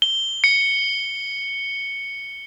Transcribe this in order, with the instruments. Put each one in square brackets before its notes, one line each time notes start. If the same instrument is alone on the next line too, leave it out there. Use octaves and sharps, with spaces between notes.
[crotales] G7
C#7